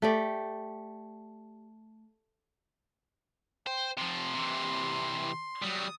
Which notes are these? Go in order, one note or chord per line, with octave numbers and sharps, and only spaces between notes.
A3 G4 D5
C5 G5
C3 F3 C6
C3 E3
F#3 G3 D#6